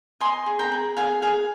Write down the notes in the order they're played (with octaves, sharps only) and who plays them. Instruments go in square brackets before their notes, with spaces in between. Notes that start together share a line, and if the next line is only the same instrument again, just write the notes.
[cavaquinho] D#5 G#5 C6
G#4
G5 A#5
G#4
G#4 F5 G#5
G#4 F5 G#5